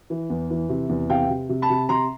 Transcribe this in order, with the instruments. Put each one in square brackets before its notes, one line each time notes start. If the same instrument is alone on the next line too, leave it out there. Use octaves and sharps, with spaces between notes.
[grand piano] E3
E2
E3
C3
E2
C3 F5 G5
C3
C3
A5 B5
C3
C3 A#5 C6